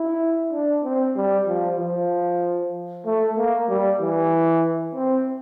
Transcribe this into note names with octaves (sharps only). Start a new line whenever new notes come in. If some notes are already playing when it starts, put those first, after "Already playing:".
Already playing: E4
D4
C4
G3
F3
F3
A3
A#3
G3
E3
C4